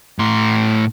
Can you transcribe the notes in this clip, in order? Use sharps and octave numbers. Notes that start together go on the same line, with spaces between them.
A2 C6